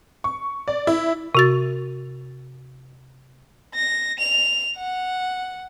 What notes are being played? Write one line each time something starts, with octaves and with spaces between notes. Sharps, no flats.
C#6
D5
E4
C3 F#4 A6
A#6
F7
F#5